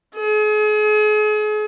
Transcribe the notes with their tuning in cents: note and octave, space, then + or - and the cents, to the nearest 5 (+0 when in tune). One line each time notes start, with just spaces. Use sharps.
G#4 +40